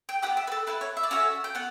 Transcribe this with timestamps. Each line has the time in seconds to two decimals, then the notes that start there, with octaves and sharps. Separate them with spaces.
0.09 G5
0.22 B3 E4 G4 F#5
0.37 E5
0.47 B4
0.52 A4
0.67 B3 E4 A4 B4
0.81 C#5
0.97 E5
1.03 D5
1.10 C#4 F#4 A4 E5
1.44 G5
1.55 B3 F#5